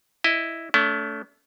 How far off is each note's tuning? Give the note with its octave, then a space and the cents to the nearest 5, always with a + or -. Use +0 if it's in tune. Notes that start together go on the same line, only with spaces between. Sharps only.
E4 +0 D#5 +0
A3 +0 C#4 +45